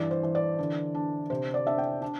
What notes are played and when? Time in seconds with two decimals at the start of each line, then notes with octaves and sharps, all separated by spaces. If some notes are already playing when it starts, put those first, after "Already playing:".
Already playing: G2 E3 D5
0.11 C5
0.23 E3
0.35 D5
0.59 D3
0.95 D4
1.30 C3 C5
1.54 D5
1.67 D4 E5
1.78 G5
2.02 D4